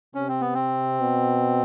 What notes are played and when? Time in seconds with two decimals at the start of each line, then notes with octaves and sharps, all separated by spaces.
0.15 C3 C#4
0.28 C4
0.41 B3
0.54 C4
1.00 B2